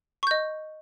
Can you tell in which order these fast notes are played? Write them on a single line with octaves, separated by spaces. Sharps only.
C#6 G6 D#5